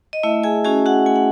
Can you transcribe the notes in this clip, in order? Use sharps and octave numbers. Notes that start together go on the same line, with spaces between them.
D#5
A3 E4 E5
G#4 G#5
C#4 F#4 G#4 G#5
F#4 F#5
A3 G#5
F#5